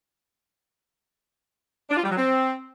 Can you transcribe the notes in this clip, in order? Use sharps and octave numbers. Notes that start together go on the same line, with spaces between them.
D4
F4
G3
F#3
C4